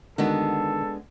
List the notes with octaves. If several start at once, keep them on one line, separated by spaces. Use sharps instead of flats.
D3 D#3 G#3 B3 D4 F#4 A4